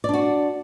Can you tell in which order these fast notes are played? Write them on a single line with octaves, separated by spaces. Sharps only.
D5 D4 F#4